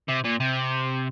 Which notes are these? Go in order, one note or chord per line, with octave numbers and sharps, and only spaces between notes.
C3
A#2
C3